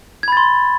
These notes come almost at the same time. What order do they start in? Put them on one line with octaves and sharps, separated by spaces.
G#6 B5 A6 C6